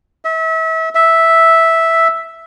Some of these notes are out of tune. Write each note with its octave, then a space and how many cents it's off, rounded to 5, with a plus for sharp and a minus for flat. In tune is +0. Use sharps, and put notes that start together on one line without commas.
E5 -35
E5 -5